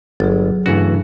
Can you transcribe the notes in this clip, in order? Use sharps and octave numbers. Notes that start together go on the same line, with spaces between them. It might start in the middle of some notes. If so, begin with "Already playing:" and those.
G1 F#3 G#4
G2 C#3 E3 A3 F#4